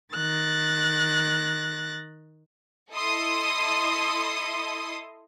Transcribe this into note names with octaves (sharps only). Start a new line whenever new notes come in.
D#3 F#6 A6 A#6
E4 A4 D#5 C6 D#6